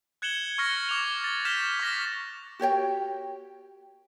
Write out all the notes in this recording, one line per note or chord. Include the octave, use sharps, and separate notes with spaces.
F#6 G#6 C#7 E7 F#7 G7
C#6 F6 A#6 C#7
D6 F7
A6
F6 G6 B6 E7
D6 F6 A#6 B6
F#4 G4 C#5 G5